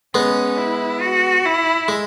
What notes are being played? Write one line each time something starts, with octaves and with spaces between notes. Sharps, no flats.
G#3 B3 C#4
E4
F#4
E4
G#3